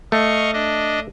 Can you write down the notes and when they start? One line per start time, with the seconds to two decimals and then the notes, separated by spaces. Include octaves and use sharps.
0.12 A3 D#5 F5 C#6
0.53 D4 D#5